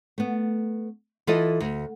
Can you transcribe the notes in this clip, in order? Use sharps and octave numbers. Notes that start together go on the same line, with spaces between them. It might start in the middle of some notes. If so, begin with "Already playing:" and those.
A3 B3
E3 F4 A4 D#5
D2